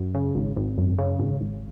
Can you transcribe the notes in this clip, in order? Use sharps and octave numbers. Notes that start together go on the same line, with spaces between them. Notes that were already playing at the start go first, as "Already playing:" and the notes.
Already playing: F#2
C#3
G#1
G#1
F#2
C#3
G#1
G#1